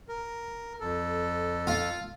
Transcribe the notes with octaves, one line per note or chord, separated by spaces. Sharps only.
A#4
F2 A4
F4